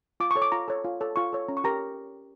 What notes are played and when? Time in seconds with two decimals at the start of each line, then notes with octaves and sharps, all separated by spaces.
0.20 F4 D6
0.31 C#6
0.36 A4 C#5
0.42 D6
0.52 F4 A#5
0.68 A4 C#5
0.84 F4
1.01 A4 C#5
1.16 F4 C#6
1.33 A4 C#5
1.48 C#4 A#5
1.57 C#6
1.64 G4 A#4 A#5